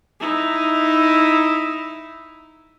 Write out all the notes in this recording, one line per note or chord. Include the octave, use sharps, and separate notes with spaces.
D#4 E4